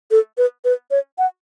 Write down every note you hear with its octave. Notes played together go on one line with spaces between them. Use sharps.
A4
B4
B4
C#5
F#5